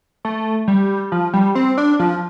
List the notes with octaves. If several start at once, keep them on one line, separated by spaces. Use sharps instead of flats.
A3
G3
F3
G3
C4
D4
F3